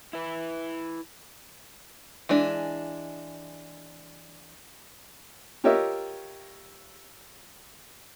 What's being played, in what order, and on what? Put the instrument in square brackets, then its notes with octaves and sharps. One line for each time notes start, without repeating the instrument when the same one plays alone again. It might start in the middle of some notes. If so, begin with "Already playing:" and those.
[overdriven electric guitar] E4 B4
[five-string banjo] E3 G#3 D4
[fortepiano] F4 G4 A#4 C#5 D#5 E5